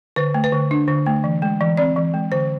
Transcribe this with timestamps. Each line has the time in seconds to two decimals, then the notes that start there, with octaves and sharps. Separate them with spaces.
0.16 D3 B4
0.34 A3
0.44 B4
0.53 D3
0.71 D4
0.88 D3
1.06 A3
1.24 E3
1.42 G#3
1.61 E3
1.77 C4 D5
1.96 E3
2.14 G#3
2.32 D3 C5